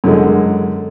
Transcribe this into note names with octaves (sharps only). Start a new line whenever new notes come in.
F#2 D3 G#3